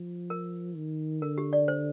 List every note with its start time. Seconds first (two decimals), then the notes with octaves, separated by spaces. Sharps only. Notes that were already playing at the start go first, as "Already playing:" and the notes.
Already playing: F3
0.30 A#4
0.76 D#3
1.22 D3 A#4
1.38 G4
1.53 D5
1.68 C5